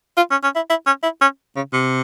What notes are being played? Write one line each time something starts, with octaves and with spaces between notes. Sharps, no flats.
F4
C#4
C#4
E4
E4
C#4
E4
C#4
C#3
C3